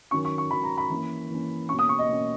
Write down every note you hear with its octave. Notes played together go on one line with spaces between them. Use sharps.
D#3 F#3 C#4 C#6
C#6
C#6
D#3 F#3 C#4 B5
A#5
B5
E3 A#3 C#4
E3 A#3 C#4
B2 A#3 C#4 C#6
D#6
C#6
D#5
B2 A#3 C#4